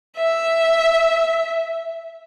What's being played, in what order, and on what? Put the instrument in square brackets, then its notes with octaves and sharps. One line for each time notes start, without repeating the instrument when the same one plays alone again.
[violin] E5